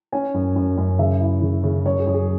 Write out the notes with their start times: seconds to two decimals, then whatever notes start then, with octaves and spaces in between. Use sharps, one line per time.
0.12 C#4 G#5
0.34 F#2
0.56 F#2
0.77 F#2
0.99 C#3 E5
1.20 E4
1.42 C#3
1.64 C#3
1.85 F#2 C#5
1.99 G#4
2.07 F#2
2.14 G#4